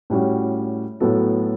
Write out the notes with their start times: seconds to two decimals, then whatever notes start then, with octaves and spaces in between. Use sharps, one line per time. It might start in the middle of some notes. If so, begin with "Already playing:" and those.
0.10 A2 G3 C#4 F#4
1.00 A2 F#3 B3 F#4 A4